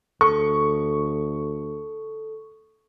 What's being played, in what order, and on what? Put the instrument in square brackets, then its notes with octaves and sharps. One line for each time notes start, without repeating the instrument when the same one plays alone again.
[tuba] D2 [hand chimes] A4 [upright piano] C#6